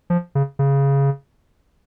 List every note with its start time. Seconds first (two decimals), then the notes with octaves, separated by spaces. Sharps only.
0.10 F3
0.35 C#3
0.59 C#3